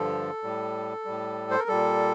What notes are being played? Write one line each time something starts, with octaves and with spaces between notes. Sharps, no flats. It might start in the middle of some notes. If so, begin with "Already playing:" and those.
Already playing: G2 D3 F3 A4
A2 G3
A2 G3
C5
A#4
A#2 G3 A4